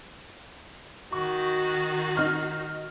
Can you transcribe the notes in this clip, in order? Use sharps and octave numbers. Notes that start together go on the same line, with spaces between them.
D#3 F#4 C#6
D#4 F6